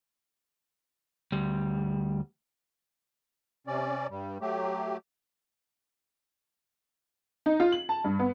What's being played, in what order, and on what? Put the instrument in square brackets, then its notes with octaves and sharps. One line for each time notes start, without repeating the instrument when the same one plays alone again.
[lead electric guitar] D2 G3
[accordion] C3 C#4 D5
G2 G3
F#3 A3 G4
[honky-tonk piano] D#4
F4
F#7
A5
G2
B3